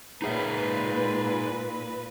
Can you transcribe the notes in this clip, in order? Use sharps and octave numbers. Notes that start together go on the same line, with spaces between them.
A#2 D#4 G#4 B4 E5